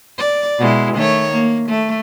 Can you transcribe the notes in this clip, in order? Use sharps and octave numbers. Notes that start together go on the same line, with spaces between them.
D5
B2 G#3 E4
D#3 A3 C#5
A#3
A3